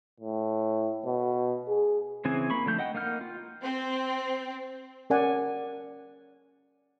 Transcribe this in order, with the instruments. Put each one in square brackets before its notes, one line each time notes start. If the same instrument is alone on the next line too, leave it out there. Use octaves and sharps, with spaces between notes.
[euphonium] A2
B2
G#4
[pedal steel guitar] C#3 E3 C4 G#4 G#5
A#3 B5 C#6
D3 F3 A3 G6
D#5 F#5 G5
A#3 D#4 F#5 F6 G6
F4
[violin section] C4
[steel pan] C#4 A#4 D5 F#5 G#5